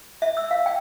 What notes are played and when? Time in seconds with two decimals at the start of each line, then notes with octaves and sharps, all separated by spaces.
0.22 E5
0.37 E6
0.51 F5
0.66 G5